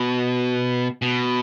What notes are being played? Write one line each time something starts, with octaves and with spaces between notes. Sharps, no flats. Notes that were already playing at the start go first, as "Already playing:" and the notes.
Already playing: B2
B2